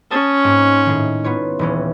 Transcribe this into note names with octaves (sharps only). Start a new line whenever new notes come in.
C#4 A5 D#6 A6
G#2 A#3 C4
A2 D#3
B3 F4 C#5
D#1 E3 C#4